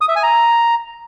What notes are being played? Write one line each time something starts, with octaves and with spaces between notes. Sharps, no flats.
D#6
E5
G#5
A#5